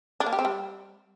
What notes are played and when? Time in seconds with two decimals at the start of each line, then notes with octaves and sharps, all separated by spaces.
0.20 D4
0.26 A#3
0.33 G4
0.39 C4
0.45 G3